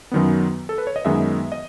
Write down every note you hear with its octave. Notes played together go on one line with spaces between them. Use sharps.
F#2 D#3 F#3 B3
A4
B4
C#5
D#5
F#2 D#3 G#3 B3 E5
D#5